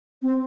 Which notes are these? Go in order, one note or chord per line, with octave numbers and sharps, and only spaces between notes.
C4